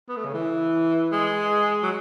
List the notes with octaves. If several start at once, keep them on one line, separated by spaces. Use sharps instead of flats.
B3
A3
C#3
E3
G#3
F#3